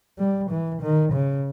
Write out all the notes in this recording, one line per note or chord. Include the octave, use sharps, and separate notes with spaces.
G3
E3
D#3
C#3